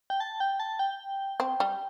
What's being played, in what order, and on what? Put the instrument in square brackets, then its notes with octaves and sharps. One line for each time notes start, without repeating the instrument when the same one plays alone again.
[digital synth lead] G5
A5
G5
A5
G5
[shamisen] C4
G3